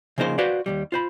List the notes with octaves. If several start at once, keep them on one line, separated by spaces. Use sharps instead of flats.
C#3 F3 A#3 D#4 C5 C6
F#4 B4 C5 D5 F5
D#2 E3 G3
F4 C5 B5